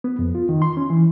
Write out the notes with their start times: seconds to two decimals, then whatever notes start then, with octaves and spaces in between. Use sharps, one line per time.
0.04 B3
0.19 F2
0.35 F4
0.49 D#3
0.62 C6
0.77 C#4
0.90 E3